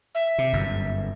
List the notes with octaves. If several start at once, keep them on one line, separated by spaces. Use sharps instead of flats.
E5
C3
G1 F#2